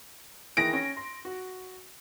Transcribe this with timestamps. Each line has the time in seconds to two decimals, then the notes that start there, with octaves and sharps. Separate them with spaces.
0.57 D#3 E3 G#4 A#6 D7
0.73 C#4
0.97 C6
1.25 F#4